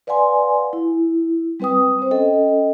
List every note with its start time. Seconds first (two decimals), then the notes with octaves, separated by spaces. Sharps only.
0.07 B4 D5 F5 F#5 G#5 C6
0.73 E4
1.60 G3 C4 B4 G5 D#6
1.99 C4 C5
2.11 C#4 A4 D#5 G5